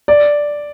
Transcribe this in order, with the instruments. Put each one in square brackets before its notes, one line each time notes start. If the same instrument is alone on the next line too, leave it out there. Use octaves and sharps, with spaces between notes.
[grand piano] D5